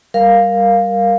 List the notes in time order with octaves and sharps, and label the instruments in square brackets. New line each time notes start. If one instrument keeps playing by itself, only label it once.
[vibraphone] G3 A#4 F5